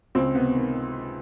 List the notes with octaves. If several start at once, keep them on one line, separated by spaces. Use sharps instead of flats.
C#2 C4
C3 B3
D#3